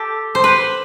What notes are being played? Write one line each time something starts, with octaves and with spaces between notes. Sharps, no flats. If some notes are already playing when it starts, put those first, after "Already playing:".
Already playing: G4 A4
C5
B4